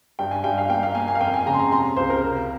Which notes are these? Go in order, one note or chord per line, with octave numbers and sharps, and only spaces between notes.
G2 G5
G#5
G2 G5
F5
A#3 G5
F5
A#3 G#5
G#5
F5
F2 G5
G#5
C#3 A#5
C6
A#5
C3 C6
C#2 C5
A#4
C3